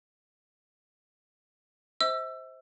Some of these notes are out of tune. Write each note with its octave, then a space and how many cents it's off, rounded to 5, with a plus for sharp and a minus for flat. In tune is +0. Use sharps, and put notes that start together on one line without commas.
C5 +0 E5 -40 E6 +20